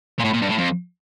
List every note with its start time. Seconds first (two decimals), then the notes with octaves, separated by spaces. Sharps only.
0.20 A#2
0.25 A2
0.34 A#2
0.42 G2
0.50 A2
0.58 F2